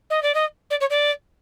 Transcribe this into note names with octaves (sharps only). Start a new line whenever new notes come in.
D#5
D5
D#5
D5
C#5
D5